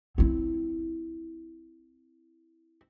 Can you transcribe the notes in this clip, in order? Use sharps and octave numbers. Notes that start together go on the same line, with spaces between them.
C4 E4